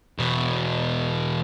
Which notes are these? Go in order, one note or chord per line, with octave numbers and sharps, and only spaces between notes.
E2 B2